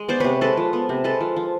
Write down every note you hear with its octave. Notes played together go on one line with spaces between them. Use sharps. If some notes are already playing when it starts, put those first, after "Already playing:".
Already playing: G#3
B3 C5 D5
C3 B4 C#5
G#3 A4 B4
F3
B3
C3
G#3 A4 B4
F3
F3